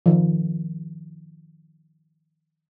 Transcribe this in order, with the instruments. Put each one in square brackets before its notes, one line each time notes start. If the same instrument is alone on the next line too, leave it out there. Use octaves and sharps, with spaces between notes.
[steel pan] D#3 F3